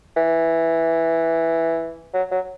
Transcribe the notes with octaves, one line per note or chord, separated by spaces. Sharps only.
E3
F#3
F#3